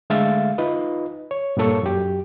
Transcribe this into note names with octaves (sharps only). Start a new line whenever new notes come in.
D3 G#3 A3 E5 F5 A6
D#4 F4 B4 D#5
C#5
G2 A#2 A#3 A4 C#5 C#6
F#2 G4